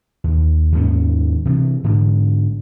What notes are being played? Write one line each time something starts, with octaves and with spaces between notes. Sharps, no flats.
D#2
D#2 G#2 D#3 C#4
C3 E3
G#2 D3